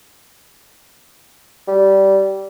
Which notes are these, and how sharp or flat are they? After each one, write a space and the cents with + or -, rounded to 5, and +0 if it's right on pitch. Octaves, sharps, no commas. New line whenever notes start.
G3 -15